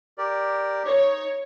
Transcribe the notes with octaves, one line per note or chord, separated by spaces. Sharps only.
G4 A#4 D5
D#4 C#5